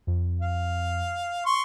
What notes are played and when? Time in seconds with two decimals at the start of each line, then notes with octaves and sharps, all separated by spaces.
0.07 F2
0.41 F5
1.45 C6 C#6